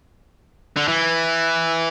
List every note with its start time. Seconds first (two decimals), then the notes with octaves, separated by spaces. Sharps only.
0.77 D3
0.88 E3